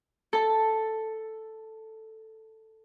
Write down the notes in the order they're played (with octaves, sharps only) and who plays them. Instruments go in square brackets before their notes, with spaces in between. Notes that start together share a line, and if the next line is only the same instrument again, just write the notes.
[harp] A4 A5